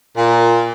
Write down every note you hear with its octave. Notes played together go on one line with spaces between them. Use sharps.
A#2